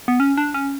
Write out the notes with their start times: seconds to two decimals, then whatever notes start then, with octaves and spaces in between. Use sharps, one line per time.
0.08 B3
0.20 C#4
0.38 D4
0.54 C#4